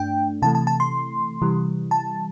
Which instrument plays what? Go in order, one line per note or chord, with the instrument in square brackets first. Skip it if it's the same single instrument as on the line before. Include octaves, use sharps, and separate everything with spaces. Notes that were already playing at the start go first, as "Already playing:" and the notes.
Already playing: [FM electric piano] G2 A3 D4 G5
C3 E3 A3 A5
A5
A5
C6
C3 E3 G3
A5